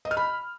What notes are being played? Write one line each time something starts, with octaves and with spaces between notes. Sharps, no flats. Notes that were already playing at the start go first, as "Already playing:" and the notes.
D#5
F6
B5